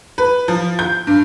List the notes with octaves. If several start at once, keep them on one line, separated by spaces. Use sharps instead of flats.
B4
F3
G6
G2